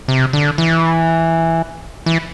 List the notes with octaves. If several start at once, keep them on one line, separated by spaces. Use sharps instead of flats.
C3
D3
E3
E3